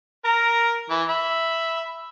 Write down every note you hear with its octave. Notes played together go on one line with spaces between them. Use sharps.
A#4 A#5
E3
E5 B5